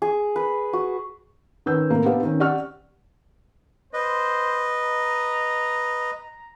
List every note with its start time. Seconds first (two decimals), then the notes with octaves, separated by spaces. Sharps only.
0.02 G#4
0.36 B4
0.73 F#4
1.66 D#3 C#4 B4 E6 G6
1.90 A2 C3 A#3
2.05 B3 C4 D4 G4 F5
2.23 D#3 C4 C#4
2.40 G4 D5 F#5 C#6 F6
3.93 B4 C5 D#5
4.80 A#5